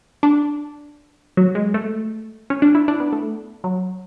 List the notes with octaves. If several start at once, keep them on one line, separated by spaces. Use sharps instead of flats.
D4
F#3
G#3
A3
C#4
D4
E4
D4
B3
A3
F#3